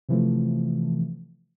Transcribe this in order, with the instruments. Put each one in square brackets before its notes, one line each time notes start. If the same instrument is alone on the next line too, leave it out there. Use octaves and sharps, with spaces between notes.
[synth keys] C3 E3 F3 A3